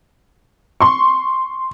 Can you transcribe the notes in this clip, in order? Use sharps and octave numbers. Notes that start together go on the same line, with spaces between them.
C6 C#6